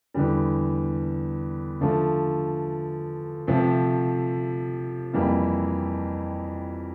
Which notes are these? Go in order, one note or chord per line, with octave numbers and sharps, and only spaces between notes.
E2 D3 G3
D3 F3 A3
C3 F3 A3
F2 E3 G3 A#3